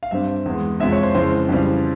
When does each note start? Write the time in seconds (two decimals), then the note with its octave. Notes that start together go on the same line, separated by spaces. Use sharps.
0.03 F5
0.11 G2 G3 C4 E5
0.46 E2 E3 G#3
0.80 F2 C3 F3 G#3 E5
0.92 C#5
1.03 C5
1.15 F2 C#3 E3 G#3 C5
1.49 F2 C#3 E3 G3 C4